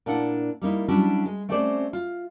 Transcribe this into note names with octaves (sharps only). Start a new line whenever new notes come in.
A#2 D4 E4 F#5
G3 A#3 D#4 E4
F#3 G3 C#4 D4 E4 F#4
G#3
A3 C4 C#4 G4 C5 D5
F4